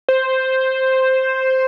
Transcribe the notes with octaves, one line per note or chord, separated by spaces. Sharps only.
C5